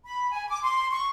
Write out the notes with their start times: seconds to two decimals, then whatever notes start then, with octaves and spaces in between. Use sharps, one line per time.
0.05 B5
0.32 G#5
0.48 D6
0.61 C6
0.91 C#6